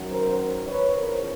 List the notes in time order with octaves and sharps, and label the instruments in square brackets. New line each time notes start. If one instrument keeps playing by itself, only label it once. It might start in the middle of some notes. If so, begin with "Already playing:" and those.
Already playing: [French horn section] F#2 D#3 F#3
A#4 C5
B4 C#5
E2 C#3 F3 A#4 C5